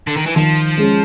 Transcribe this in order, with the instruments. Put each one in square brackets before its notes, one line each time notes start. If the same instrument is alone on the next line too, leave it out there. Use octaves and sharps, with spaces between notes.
[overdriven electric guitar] D3
D#3
E3
[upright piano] D#3 [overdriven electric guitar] F3
[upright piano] G#3 C#4